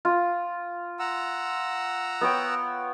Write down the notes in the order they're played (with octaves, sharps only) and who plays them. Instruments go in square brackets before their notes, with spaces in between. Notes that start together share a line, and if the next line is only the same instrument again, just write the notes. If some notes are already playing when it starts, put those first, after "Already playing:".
[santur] F4
[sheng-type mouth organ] F#5 A#5 E6
[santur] B3 C#5 G5